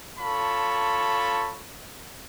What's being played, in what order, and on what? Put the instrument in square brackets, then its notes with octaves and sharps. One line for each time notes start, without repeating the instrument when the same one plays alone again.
[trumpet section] F4 A4 C#5 A5 B5 C#6